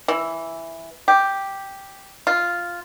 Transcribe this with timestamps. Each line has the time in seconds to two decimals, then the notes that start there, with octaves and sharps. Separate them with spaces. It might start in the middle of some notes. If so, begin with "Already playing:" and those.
0.08 E3
1.08 G4
2.27 F4